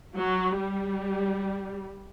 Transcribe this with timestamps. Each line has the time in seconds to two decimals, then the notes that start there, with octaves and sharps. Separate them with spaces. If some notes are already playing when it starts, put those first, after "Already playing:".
0.16 F#3
0.58 G3